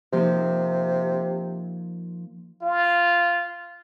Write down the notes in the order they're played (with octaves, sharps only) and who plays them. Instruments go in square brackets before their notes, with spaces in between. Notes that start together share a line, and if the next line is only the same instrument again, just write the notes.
[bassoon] C3 [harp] F3 A#3 D#4
[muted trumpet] F4